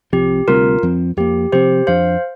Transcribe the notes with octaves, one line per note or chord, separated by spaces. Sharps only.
C2 C3 F3 C4 G4
D2 C3 G3 C4 F4 A#4
F2 F3 C4
F2 F3 A#3 G4
C3 F3 C4 G4 C5
F2 F3 D4 C5 F5